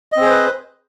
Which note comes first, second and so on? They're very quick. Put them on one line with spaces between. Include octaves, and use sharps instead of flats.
D#5 C4 G#4 C5 B4